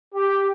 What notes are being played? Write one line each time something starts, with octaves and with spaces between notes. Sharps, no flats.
G4